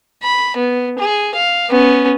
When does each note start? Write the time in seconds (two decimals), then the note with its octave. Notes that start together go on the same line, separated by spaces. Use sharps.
0.23 B5
0.57 B3
0.98 G#4
1.35 F5
1.70 B3 C#4